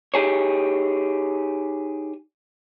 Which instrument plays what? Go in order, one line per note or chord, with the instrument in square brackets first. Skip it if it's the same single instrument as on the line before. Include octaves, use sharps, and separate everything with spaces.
[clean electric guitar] D#4 G4 G#4 C#5